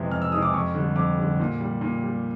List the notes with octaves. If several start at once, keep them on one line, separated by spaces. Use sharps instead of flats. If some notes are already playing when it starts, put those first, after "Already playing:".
Already playing: F2 C3 E3 G#3
F2 F6
E6
C3 E3 G#3 D#6
D6
F2 C#6
D3 G3
F2 D6
D3 G3
A#2
G3
A#2
G3